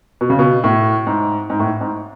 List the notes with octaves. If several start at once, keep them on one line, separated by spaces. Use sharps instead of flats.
B2
C#3
B2
A2
G#2
G#2
A2
G#2